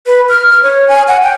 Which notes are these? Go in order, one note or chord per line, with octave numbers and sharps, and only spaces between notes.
B4
F6
F6
C#5
G#5
F#5
G5